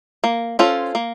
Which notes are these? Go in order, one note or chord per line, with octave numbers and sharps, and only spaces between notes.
A#3
C#4 F4 A4 C5
A#3